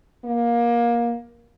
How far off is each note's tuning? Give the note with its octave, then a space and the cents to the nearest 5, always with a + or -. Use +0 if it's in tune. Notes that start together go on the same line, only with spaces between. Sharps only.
A#3 +20